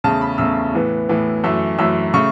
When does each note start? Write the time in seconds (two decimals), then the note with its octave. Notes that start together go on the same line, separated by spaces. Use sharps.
0.04 E2 C#3 A3 A5
0.21 B5
0.38 E2 C#3 A3 E6
0.73 A2 E3 B3
1.09 A2 E3 B3
1.44 F#2 E3 A3 E6
1.79 F#2 E3 A3 E6
2.14 C#3 A3 C#6